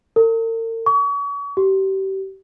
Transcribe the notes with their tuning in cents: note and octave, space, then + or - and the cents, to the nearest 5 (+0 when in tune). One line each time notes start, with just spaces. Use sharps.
A#4 -45
C#6 +40
G4 -30